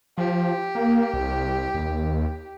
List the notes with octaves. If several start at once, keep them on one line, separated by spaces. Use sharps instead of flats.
F3 G4
A#3
C2
D#2